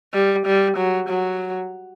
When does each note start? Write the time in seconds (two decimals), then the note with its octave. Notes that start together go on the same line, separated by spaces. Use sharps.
0.14 G3
0.46 G3
0.77 F#3
1.09 F#3